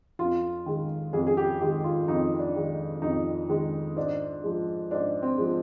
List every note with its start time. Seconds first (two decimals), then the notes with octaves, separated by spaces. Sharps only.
0.19 F2 F4
0.66 D#3 G#3
1.13 F2 G#4
1.27 G#4
1.37 G4
1.60 D#3 G#3 G4
1.84 F4
2.08 F2 D#4
2.39 D4
2.56 D#3 G#3
3.02 F2 D#4
3.49 D#3 G#3
3.96 G#2 D4
4.44 F3 G#3
4.91 G#2 D4
5.23 C4
5.38 F3 G#3